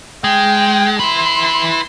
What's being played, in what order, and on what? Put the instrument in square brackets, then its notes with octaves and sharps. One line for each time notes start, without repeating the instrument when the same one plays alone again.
[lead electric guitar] G#3 [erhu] G5
[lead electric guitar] E4 B4 [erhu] C6